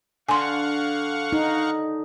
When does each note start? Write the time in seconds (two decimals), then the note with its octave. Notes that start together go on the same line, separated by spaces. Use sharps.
0.29 D3 F5 F#5 G#5 C6 C#6
1.33 D#4